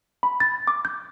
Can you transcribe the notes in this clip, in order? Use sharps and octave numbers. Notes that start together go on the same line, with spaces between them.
B5
A6
D6
G6